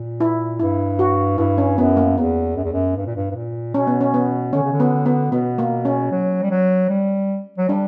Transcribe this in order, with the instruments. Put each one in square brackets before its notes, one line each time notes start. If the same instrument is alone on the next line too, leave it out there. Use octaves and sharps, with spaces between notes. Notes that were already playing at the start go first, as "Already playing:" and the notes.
Already playing: [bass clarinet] A#2
[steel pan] E4
[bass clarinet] G2 [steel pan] E4
[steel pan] F#4
[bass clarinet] G2 [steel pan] E4
[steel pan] C#4
[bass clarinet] F#2 [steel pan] B3
[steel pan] A#3
[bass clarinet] E2 [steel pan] B3
[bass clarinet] F#2
E2
F#2
G2
A#2
G2
G2
A#2
[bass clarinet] B2 [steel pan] C#4
[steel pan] B3
C#4
B3
[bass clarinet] D3 [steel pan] C#4
[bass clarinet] C#3
D3
[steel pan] B3
B3
[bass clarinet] B2 [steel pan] B3
[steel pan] A#3
C#4
[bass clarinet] F#3
G3
F#3
G3
F#3
[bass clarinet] G3 [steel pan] D4